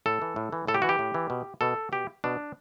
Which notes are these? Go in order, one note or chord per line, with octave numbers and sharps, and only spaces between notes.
A2 A4
E3
A2
E3
A2 A4
G4
E3 F#4
G4
A2
E3
B2
B2 A4
B2 G4
B2 D4